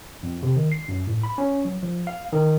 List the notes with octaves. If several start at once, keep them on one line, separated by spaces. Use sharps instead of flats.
F2
C3
D#3
C7
F#2
A2
B5
C#4
F#3
F3
F5
D#3